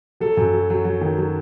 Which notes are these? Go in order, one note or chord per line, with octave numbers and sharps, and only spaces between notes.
F#3 A4
F#2
F#3
F#3
F#3
D#3
F#3